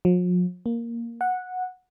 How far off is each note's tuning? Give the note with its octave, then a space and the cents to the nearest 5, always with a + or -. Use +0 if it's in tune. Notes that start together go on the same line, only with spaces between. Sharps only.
F3 +45
A#3 +0
F#5 -10